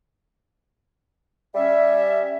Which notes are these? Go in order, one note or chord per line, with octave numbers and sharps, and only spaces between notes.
G3 C#4 E5